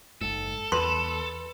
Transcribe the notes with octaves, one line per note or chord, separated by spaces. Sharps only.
F#1 G#2 A4
E2 B4 C6